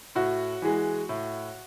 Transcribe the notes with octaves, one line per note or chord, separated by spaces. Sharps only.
A2 F#4
E3 G#3
A2